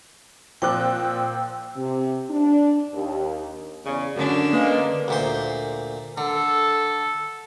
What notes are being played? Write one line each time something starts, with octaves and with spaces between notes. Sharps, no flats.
A#2 F3 C4 C5 G5 D6 E6 F#6
C3
D4
D#2
E2 C#3 D5
F#2 D3 C#4 D4
G#3 A#3 B4
D2 A#2 C5
D3 A4